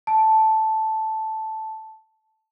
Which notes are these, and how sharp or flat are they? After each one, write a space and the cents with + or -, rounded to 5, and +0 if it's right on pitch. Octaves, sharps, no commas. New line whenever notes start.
A5 -5